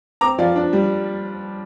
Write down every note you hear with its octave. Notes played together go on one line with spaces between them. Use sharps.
C4 A#5 D6
F3 D5 F5
D4
G3